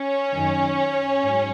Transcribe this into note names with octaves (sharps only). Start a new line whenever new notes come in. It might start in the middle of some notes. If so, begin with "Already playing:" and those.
Already playing: C#4 C#5
F#2 D#3 F#3
G#2 F#3